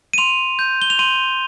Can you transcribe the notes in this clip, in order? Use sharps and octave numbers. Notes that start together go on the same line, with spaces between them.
D#7
C6 F7
G6
G7
F7
C6 D#7